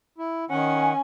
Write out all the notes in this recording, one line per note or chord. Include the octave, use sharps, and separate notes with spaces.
E4
D#3 C#4 F#5 G#5